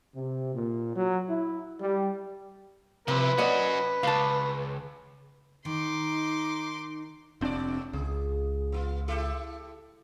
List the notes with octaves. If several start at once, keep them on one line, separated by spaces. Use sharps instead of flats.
C3
A#2
F#3
E4
G3
C3 F3 E4 B4
C#4 F#4 D5 D#5 F#5
C#2 F5 A5
D#3 D#4 C6 D6
F1 G#2 C4 D4 D5
C#2 G#4
B3 E4 F4
E4 G4 A4